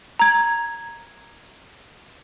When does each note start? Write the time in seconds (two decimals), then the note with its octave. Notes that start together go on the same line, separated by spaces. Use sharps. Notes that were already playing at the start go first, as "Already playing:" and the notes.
0.20 A#5 G#6